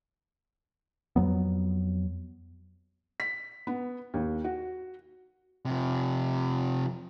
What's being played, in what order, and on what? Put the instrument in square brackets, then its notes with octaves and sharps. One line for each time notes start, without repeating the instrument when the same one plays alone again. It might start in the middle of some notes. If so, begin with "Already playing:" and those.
[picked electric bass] F2 F#3 B3
[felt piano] B6
B3
D#2
F#4
[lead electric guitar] C3 F3